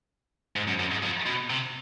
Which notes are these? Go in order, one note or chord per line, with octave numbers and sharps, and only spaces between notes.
G#2
F#2
F#2
G#2
F2
B2
C3